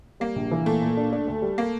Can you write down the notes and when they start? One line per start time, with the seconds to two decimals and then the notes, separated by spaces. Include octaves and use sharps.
0.20 G3 A#3
0.36 A#1
0.51 E3
0.66 A#2 A3
0.82 A#2
0.97 D4
1.12 D4
1.27 D2
1.42 G3
1.58 A#3